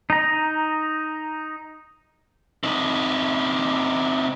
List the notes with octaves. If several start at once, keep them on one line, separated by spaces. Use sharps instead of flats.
D#4 A#5
C3 D#4